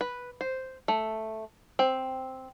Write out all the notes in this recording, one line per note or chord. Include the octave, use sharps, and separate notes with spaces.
B4
C5
A3
C4